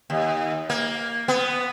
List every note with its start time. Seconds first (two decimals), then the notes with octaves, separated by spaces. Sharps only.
0.10 D#2
0.70 A#3
1.28 B3